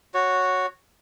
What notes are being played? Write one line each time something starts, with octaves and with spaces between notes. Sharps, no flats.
F#4 C#5